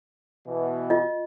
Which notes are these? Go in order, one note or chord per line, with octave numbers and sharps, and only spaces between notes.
B2 E3
F4 D#5